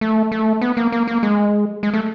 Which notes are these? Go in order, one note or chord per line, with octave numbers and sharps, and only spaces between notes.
A3
A3
B3
A#3
A#3
A#3
G#3
G#3
A3